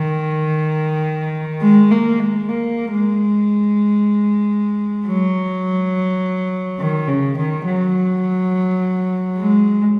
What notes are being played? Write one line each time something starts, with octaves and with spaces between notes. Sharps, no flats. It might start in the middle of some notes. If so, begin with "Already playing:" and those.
Already playing: D#3
G#3
A#3
G#3
A#3
G#3
F#3
D#3
C#3
D#3
F#3
G#3